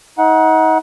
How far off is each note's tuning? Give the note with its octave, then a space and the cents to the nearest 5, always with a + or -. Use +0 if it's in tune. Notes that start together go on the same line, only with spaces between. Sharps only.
D#4 +35 F#5 +0